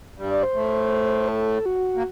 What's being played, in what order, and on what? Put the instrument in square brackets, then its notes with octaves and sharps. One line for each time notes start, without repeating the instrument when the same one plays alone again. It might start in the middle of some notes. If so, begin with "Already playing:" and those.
[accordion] G2 G3
[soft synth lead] D5
C5
[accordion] A2 A3
[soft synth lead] A4
F#4
[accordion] A#3